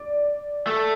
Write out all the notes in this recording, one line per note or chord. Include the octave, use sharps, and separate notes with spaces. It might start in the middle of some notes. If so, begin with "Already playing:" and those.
Already playing: D5
A3